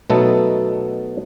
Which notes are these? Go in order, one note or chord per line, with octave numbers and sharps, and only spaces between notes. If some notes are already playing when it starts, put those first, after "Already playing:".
B2 F#3 A3 B3 D#4 A4